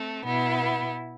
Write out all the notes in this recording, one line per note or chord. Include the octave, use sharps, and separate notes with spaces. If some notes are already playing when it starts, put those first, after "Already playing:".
Already playing: A3 C4
B2 B3 E4